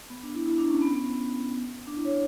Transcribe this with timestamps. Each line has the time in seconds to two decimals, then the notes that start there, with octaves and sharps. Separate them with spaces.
0.10 B3
0.23 D4
0.35 E4
0.46 E4
0.58 D4
0.70 C#4
0.82 B3
0.93 B3
1.87 D4
1.96 E4
2.05 C#5